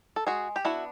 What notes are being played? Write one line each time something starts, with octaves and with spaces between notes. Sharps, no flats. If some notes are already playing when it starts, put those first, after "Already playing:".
A4
G#3 F#4 G#4
G4
B3 D4 E4 F#4